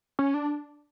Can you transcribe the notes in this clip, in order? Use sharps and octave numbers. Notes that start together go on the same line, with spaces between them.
C#4
D4